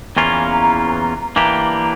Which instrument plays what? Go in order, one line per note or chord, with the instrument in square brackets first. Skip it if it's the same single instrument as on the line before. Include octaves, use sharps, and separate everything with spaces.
[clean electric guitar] E2 E3 A#3 C#4 F4 [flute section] A#5
[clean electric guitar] E3 A#3 D4 G4 [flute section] A#5